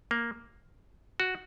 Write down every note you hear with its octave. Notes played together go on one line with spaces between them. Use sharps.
A#3
F#4